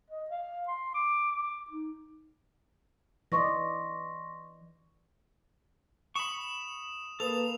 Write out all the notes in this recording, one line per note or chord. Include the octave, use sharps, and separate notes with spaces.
D#5
F5
C6
D6
D6
D#4
E3 D5 D#5 C6 C#6 A#6
B5 C#6 D#6 E7
A#3 A4 B4 D#6 F7